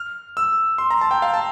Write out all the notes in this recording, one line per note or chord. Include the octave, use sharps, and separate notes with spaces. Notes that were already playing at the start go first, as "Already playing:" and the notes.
Already playing: F6
E6
C6
A#5
A5
G5
F5
A5